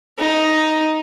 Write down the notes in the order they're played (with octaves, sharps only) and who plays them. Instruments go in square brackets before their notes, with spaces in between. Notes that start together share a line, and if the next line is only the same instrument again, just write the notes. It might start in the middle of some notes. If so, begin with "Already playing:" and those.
[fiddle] D#4